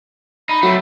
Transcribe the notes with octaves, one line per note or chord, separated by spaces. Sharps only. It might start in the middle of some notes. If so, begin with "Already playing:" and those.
D#4 B5
F#3 A3 C4